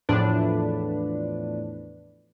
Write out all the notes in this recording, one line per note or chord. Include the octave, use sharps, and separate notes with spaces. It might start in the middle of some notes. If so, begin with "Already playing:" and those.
E2 A2 F3 D4 B4